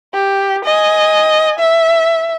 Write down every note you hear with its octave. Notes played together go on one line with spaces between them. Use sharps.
G4
D#5 G#5
E5